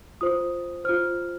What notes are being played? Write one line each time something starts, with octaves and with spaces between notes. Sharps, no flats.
F4 C5 D#6
F4 C5 F6